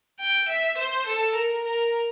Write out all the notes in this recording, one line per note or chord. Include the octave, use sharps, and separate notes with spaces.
G5
E5
C5
A4
A#4
A#4